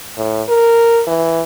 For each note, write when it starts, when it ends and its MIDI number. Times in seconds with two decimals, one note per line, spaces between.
0.17 0.42 45
0.48 1.01 70
1.07 1.42 52